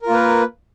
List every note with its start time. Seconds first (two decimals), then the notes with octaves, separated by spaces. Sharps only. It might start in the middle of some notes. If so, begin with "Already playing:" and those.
0.02 A#4
0.06 F4
0.10 A#3
0.14 B4